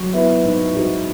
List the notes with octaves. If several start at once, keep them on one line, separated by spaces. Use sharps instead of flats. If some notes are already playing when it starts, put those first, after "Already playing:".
Already playing: F#3 F#4
B3 E4
G#2 E4
G#2 F#4